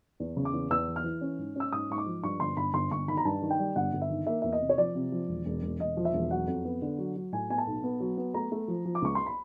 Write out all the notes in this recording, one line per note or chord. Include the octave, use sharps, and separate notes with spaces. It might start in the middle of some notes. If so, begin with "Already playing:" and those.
E2
C#3
D6
E2
E2 E6
E3
F6
E3
C#4
G#2
C#4 E6
G#2 D#6
G#2 C#6
D6
F3
G2 C#6
G1 C6
G1 B5
G1 C6
G1 C#6
D#3 B5
A#5
G2 A5
D#3
G5
G3
G1 F#5
G1
E5
D#3
A#3 E5
E2 E5
D#5
C3
C#5
F3 D5
C3
F3
E1
E1
E1
E1 D#5
F3
E5
E1
F#3 F#5
F2
B3
D3
F#3
F#3
A2 G#5
B3 G#5
A5
B1
B3
F#3
B3
A3 A#5
A3
F3
F3
D6
C#2 C#6
C6
B5